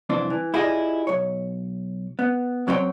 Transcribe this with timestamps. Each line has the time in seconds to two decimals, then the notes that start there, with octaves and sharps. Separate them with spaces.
0.09 C2 F2 E3 C4 D4
0.30 E3
0.54 E4 F4 G4 G#4 D5 D#5
1.07 B1 C#5
2.19 B3
2.67 F#2 F#3 C4 C5 C#5 G5